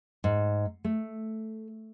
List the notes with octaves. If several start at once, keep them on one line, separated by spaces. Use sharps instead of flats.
G#2
A3